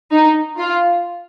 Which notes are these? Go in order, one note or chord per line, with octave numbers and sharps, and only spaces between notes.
D#4
F4